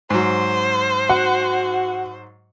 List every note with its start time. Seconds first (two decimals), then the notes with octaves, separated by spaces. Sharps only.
0.10 G#2 F#3 C5
1.09 F#4 F#5